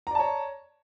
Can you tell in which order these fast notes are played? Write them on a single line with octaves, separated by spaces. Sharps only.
A#5 D5 A5 C#5